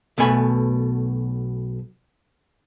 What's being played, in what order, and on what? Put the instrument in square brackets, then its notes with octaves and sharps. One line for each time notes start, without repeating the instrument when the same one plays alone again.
[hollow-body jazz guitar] B1 B2 A3 G#5 B5